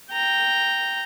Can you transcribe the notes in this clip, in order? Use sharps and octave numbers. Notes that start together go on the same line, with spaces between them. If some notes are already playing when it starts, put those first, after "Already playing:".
G5 A#5